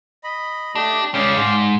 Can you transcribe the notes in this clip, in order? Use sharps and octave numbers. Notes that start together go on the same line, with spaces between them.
D#5 B5
A3 D4 G4 D#5
G#3 C#4 D5 F5 G5
G#2